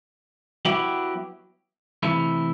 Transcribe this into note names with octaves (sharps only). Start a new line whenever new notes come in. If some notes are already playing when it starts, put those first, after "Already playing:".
F#3 B3 E4 G4
C3 E3 A3 E4